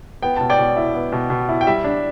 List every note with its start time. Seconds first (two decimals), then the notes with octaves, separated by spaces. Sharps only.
0.22 B3 G5
0.36 B2 A5
0.50 D5 G5
0.58 B2
0.76 E4
0.94 B3
1.12 B2
1.30 B2
1.49 E4
1.61 G5
1.67 G3 E5
1.84 D4